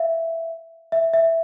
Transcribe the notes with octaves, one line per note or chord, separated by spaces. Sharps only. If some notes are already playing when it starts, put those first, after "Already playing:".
Already playing: E5 F5
E5
E5